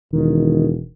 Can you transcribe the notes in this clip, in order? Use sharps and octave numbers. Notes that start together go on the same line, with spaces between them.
E1 D#3